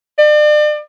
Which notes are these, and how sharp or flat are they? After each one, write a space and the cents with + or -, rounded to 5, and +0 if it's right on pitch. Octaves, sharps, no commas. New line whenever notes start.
D5 +35